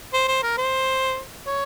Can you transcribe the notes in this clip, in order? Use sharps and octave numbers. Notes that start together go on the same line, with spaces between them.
C5
C5
A#4
C5
C#5